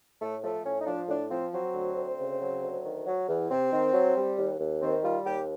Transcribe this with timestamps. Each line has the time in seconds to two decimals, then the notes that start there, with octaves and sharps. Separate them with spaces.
0.21 A2 A3
0.43 F3 A3
0.65 A2 C#4
0.81 D#4
0.87 F3 D4
1.09 A2 D4
1.30 F3 C4
1.53 F#3 C4
1.74 D2
1.97 D2
2.19 C#3
2.41 F#3
2.62 D2
2.85 D#3
3.06 F#3
3.28 E2
3.51 C3 C4
3.73 D#3
3.94 F#3
4.16 G3
4.38 D#2
4.60 D#2
4.82 D#3 C4
5.03 G3 F4
5.26 D#2 G4